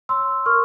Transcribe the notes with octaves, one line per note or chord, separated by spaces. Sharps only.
C#5 C6 E6
A#4 C#6 F6